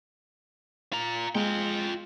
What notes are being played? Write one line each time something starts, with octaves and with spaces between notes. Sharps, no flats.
F4 A#5
G#3 F4 G5